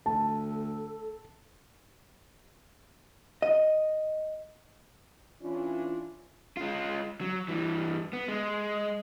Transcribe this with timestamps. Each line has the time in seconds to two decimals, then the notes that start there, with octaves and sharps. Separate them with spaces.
0.06 D2 A4 A5
3.42 D#5
5.42 E3 C#4 D4 F4
6.57 G#3 F4
7.21 F#3
7.48 G2 E3
8.13 B3
8.28 G#3